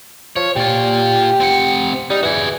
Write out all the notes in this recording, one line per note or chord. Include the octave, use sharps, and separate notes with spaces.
F3 C#5
A#2 F4 G4
C4 F#5
G3 D#4
E3 F#4 G#4